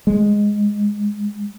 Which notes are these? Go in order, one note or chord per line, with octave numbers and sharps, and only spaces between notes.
G#3